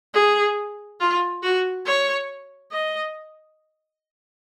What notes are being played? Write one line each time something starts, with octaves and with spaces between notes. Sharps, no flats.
G#4
F4
F#4
C#5
D#5